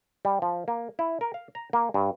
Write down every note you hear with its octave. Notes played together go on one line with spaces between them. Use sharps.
G3
F3
A#3
E4
A#4
F5
A#5
A#3
G2